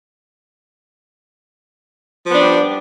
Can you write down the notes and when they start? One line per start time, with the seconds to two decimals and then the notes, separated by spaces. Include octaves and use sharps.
2.25 F3
2.30 B3
2.35 D4
2.40 G3